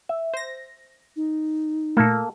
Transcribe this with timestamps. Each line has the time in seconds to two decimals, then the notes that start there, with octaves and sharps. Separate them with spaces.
0.09 E5
0.34 C5 A#6
1.16 D#4
1.97 A#2 A3 A#3 A4